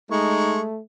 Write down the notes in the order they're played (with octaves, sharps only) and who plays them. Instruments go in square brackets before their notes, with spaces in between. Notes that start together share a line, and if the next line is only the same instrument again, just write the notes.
[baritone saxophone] G#3 [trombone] A3 [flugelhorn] D#4 [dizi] C#6